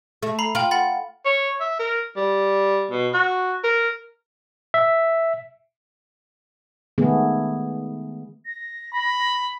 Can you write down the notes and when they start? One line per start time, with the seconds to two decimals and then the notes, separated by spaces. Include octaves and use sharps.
0.23 A3
0.39 A#5 B5 C7
0.55 F4 G5 F#7
0.71 F#5 B5 A6
1.25 C#5
1.60 E5
1.79 A#4
2.16 G3
2.91 B2
3.14 F#4
3.64 A#4
4.74 E5
6.98 D#3 G#3 A3 B3 G#4
8.46 A#6
8.94 B5